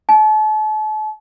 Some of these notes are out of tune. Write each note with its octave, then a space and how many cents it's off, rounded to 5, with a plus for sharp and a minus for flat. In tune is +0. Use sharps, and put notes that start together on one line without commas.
A5 -40